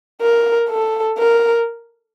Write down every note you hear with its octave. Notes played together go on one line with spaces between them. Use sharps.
A#4
A4
A#4